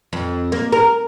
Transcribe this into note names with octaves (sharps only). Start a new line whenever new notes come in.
F2
A#3
A#4